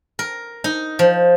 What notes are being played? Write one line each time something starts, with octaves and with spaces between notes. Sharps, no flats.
A#4
D#4
F3